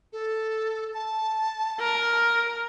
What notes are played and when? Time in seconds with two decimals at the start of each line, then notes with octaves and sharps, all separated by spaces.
0.13 A4
0.94 A5
1.80 A#4